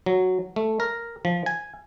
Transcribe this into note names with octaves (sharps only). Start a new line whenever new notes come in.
F#3
A3
A#4
F3
G#5